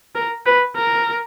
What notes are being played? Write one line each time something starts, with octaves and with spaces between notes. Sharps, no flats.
A#4
B4
A#4